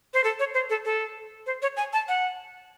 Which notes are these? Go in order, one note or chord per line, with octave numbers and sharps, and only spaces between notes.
C5
A4
C#5
C5
A4
A4
C5
C#5
G#5
A5
F#5